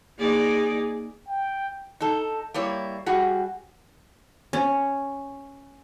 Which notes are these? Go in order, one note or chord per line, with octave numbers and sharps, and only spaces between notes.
A#3 D#4 G#4 D5
G5
D#4 A4
G3 A#3 E4 C#5
G3 F#4 G#4
C#4